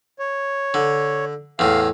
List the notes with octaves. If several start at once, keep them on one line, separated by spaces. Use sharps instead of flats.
C#5
D3
E2 A2 F5